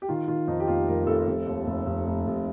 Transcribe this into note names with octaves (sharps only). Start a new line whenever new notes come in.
G4
D#3 F4
D#3 F4
F2 D#4
G4
F1 F4
F1 A#4
F1 A4
F1
D#2
F1
F1
F1
F1